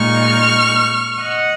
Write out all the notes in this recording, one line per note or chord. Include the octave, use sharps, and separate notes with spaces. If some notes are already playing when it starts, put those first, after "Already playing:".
Already playing: A#2 G#3 D#4 C#6 F6
D#5 F#5